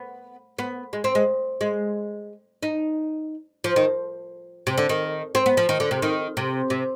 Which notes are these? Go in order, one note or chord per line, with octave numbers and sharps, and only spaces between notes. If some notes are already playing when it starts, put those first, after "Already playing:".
Already playing: B3
B3
G#3
C4
G#3
G#3
D#4
F3
D#3
C3
D3
D#3
C4
B3
F3
D#3
D3
C3
D#3
C3
C3